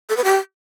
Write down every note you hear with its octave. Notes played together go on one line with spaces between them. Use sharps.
A4
B4
G4